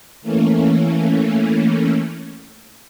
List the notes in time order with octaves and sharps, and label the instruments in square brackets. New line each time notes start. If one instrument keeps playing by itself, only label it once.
[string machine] E3 A3 A#3 C#4